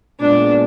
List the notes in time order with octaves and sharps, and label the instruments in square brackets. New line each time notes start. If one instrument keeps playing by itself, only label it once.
[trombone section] A#2 G#3 B3 [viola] D4